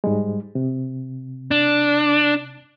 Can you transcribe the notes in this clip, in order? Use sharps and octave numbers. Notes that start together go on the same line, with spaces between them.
G#2 G3 G#3
C3
D4